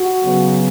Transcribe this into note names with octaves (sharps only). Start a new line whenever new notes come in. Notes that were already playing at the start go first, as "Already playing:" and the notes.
Already playing: F#4
C#3 F#3 B3